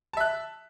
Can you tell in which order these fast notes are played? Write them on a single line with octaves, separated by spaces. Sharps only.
A5 E5 F#6